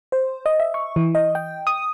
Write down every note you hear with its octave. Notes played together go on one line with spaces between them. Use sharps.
C5
D#5
E5
C#6
E3
D#5
G5
D#6